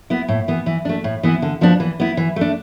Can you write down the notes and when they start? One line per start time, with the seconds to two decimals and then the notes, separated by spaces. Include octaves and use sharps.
0.10 B3 E4
0.28 A2
0.48 E3 B3
0.66 E3
0.85 A3 D4
1.04 A2
1.23 E3 B3 E4
1.42 D3
1.61 F3 B3 D4
1.80 E3
2.00 B3 E4
2.17 E3
2.36 A3 D4